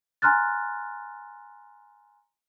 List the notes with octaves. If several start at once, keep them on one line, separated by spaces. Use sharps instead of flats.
G#5 A#5 C6 F6 F#6 A6